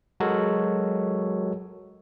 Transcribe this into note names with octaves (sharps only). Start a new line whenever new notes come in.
F#3 G#3 F#4 A4 A#4 C#5